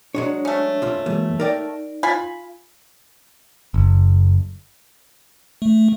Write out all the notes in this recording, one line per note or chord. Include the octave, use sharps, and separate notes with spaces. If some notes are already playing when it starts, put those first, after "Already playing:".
F#3 G#3 D4 C#5
A3 C#4
C2 F4
E3 F#3 G#3 A#3
D#4 A#4 D5 G5
F4 G#5 B5
F#1
A3